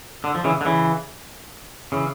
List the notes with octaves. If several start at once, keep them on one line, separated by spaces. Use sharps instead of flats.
D3
F3
C#3 E3
D3
C#3 E3
C#3 E3